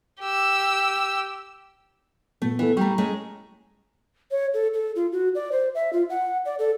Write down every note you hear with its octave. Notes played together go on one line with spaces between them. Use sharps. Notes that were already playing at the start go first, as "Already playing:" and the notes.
G4 E6
A#2 A3 B3
E3 B3 E4 A4
G3 A3 A#5 C#6
G#3 A3 C#4
C#5
A4
A4
F4
F#4
D5
C5
E5
F4
F#5
D5
A4